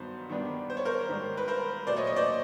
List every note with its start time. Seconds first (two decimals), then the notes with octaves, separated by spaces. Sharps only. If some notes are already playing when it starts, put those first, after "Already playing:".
Already playing: G2 D#3 F#3 B3 D#4 C5
0.29 D#3 G3 B3 D4
0.70 C5
0.77 C#5
0.85 A#4 C5
1.09 G#2 D#3 G3
1.37 B4
1.48 A#4 C5
1.87 A#2 F#3 A3 C5 D5
1.97 C#5 D#5
2.07 C#5 D#5
2.16 C5 D5